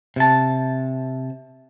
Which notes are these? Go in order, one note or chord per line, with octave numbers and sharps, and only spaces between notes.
C3 A5